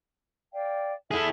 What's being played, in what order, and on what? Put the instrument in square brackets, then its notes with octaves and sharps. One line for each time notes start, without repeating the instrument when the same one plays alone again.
[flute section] D5 F5 G5
[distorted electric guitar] E4 G#4 [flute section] A4 E5 A5